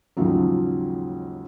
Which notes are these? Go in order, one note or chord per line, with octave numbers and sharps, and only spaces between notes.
D#2 G#2 C#3 F3 F#3